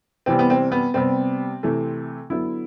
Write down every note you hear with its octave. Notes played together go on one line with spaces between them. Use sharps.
C3 E3 G3 B3 C4
B3
C4
B3
C3 G3 B3 C4
C3 E3 A3
D3 F#3 B3 E4